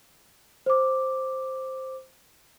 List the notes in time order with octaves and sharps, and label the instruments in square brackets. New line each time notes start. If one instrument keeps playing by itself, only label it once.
[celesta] C5 D6